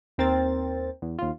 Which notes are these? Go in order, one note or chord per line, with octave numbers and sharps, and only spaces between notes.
D#2 C4 A#4 A6
E2
D#2 F4